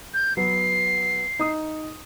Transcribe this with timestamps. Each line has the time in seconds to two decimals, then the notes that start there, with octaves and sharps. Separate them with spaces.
0.14 G6
0.37 F#3 B3 C7
1.39 D#4 D#6